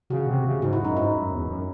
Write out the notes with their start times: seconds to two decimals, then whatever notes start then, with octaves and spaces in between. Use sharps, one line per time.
0.10 C#3 F#4
0.27 C3
0.45 C#3
0.61 G#2 F#4
0.73 E4
0.78 F#2
0.85 D#4
0.97 G#2 E4
1.13 F#2
1.31 E2
1.47 F#2